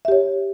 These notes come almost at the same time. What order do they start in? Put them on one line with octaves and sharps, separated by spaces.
E5 G4 C#5